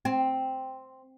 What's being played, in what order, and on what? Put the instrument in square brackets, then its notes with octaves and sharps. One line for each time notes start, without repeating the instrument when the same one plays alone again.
[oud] C4